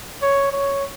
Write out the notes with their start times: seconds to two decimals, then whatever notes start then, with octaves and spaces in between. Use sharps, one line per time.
0.22 C#5
0.52 C#5